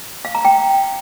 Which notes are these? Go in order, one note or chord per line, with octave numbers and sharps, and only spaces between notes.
F5
A#5
G5